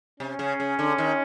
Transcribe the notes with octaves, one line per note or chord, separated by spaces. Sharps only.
C3 C#4
C#3
C#3
D3
D#3